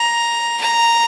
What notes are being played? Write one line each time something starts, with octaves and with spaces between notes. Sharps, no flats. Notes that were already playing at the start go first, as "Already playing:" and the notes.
Already playing: A#5
A#5